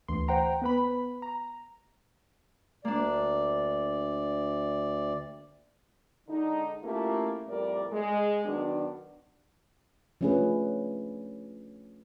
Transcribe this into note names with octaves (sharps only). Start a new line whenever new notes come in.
D2 E3 C6
C5 F#5 G5 A#5
B3 B4 B5
A#5
D2 A#3 D4 D5
D3 G#3 D4 D#4
A3 A#3 C#4 E4 F4 G4
F2 A2 G3 A#4 D5
G#3
D#3 F#3 B3 D4
F3 A3 C#4 D4 G#4 B4